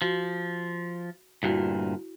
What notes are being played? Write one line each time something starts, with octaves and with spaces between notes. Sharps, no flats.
F3 F#4
D2 G2 A#2 E4 F#4